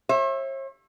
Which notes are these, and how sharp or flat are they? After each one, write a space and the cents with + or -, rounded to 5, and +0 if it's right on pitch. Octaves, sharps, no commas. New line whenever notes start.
C#5 -45 E5 +0